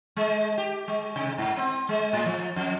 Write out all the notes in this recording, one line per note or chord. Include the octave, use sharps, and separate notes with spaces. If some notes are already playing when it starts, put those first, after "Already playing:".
G#3
G4
G#3
C3
G#2
C4
G#3
A2
F3
F2